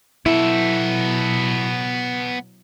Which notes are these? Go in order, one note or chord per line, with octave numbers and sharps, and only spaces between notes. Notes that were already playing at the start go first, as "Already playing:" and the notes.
B2 F#3 B3 E4 A4